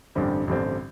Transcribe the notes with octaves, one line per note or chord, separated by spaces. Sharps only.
A1 G2 D3 G3 C4
A1 G2 D3 G3 C4